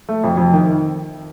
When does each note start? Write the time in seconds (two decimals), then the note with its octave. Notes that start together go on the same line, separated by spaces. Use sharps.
0.09 A3
0.24 F2
0.37 F2
0.53 D#3